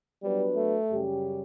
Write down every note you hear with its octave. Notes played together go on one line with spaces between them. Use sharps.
F#3 G3 B3 D4 F#4 B4
A3
F#2 C#3 G3 C#4 G4